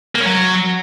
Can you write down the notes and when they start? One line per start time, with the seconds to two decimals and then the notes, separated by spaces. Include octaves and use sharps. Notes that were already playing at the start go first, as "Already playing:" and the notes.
0.15 A#3
0.20 C#4
0.26 F#3